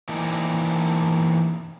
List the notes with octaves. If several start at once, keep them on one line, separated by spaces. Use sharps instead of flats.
E3 A#3 C4 D4 D#4